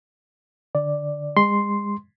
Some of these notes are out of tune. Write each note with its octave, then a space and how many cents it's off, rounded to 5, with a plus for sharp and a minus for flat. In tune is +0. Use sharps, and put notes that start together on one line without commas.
D3 +0 D5 +0
G#3 -35 C6 +0